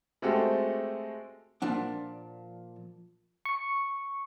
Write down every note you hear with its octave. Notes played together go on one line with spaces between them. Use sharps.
G#3 A3 C4 F#4 G4 A4
A#2 F3 D4 F#5
C#6